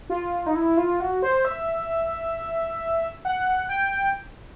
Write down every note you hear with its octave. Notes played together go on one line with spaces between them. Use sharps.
F4
D#4
E4
F4
F#4
C5
E5
F#5
G5